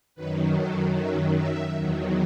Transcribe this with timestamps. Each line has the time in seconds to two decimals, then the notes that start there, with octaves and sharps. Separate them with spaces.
0.15 F#2 D#3 F#3 B4
0.56 A4
0.96 E5
1.37 E5
1.77 E2 D#3 F#3